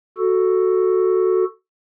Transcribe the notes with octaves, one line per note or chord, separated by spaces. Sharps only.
F#4 A4